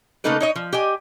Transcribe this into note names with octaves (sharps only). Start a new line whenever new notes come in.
C#3 A3 A#3 D#4 A4 B4
D#4 C#5 D#5
F3
G4 D#5 G#5